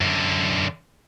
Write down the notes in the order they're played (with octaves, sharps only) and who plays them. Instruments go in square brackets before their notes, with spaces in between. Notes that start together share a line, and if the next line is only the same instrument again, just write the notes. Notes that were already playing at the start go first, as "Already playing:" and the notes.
[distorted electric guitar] F#2 D3